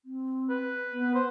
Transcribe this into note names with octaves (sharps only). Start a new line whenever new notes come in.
C4
B4
B3
C5